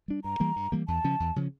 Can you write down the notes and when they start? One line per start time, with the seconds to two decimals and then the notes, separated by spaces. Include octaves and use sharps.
0.08 G3 D4
0.24 G2 A#5
0.40 E3 G3 A#3
0.56 G2
0.72 E3 G3 A#3
0.88 E2 A5
1.04 C#3 F3 C#4
1.20 E2
1.36 C#3 F3 C#4